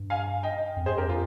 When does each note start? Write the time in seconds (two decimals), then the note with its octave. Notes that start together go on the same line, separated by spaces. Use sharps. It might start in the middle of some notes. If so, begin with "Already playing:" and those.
Already playing: G2
0.10 F5 G#5
0.43 D#5 G5
0.76 F2
0.86 G2 G#4 C5
0.96 F2 G4 A#4
1.09 F4